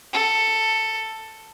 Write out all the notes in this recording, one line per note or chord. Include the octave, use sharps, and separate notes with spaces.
A4